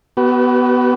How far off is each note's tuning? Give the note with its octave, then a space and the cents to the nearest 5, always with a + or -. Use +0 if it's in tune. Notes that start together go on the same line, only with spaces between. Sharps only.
B3 +0 F#4 +45